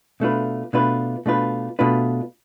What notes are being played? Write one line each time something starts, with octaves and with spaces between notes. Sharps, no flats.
B2 A3 D4 F4 B4
B2 A3 D4 F4 B4
B2 A3 D4 F4 B4
B2 A3 D4 F4 B4